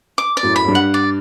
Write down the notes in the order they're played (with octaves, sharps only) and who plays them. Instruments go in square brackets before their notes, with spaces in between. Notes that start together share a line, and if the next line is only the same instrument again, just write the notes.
[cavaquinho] D6
D5
[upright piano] F#2 A2
[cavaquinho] B5
[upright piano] F#2
G2
[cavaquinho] F#5
D5